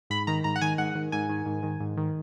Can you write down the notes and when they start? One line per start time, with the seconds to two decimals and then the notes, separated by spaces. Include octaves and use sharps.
0.10 G#2 B5
0.27 D#3 A#5
0.44 G#2 A#5
0.56 F#5
0.61 D#3 G#5
0.78 G#2 F#5
0.95 D#3
1.12 G#2 G#5
1.29 D#3
1.46 G#2
1.63 D#3
1.80 G#2
1.97 D#3